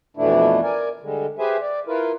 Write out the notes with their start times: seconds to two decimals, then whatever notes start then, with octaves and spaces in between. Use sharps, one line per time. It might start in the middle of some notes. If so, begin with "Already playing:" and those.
0.17 F2 B2 E3 A3 D4 E4
0.63 A#4 D5 G#5
1.02 D3 G3 G#3
1.39 G4 G#4 B4 C5 E5 G#5
1.61 D5
1.87 E4 F4 A#4 B4